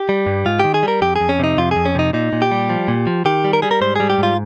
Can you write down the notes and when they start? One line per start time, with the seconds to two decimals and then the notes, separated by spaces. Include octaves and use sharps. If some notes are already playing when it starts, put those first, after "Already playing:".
Already playing: G4
0.09 G3
0.27 G2
0.46 G#2 F4
0.60 D#3 G4
0.74 G#4
0.83 G3
0.88 A#4
1.01 F2 G4
1.16 F2 G#4
1.29 C#4
1.39 C3 D#4
1.58 F2 F4
1.71 F2 G#4
1.85 C#4
1.95 C3 D#4
2.13 A#2 D#4
2.33 A#2
2.42 G4
2.51 G3
2.69 F3
2.88 A#2
3.07 F3
3.25 D#3 G4
3.44 G3
3.53 A#4
3.62 G3 G#4
3.71 A#4
3.81 G#2 C5
3.96 G3 G#4
4.10 G4
4.18 G#2 F4